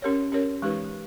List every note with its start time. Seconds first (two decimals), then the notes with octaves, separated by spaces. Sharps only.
0.02 C#4 G4 A#4 C#5
0.32 C#4 G4 A#4 C#5
0.62 E3 G#3 D#4 G4 B4